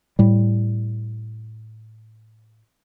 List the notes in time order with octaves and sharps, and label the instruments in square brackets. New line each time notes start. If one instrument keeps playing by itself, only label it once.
[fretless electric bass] A2 G3